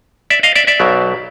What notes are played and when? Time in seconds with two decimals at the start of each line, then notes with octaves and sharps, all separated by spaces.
0.30 D5 E5
0.43 D#5 F5
0.56 D5 E5
0.67 D5 E5
0.80 B1 B2 F#3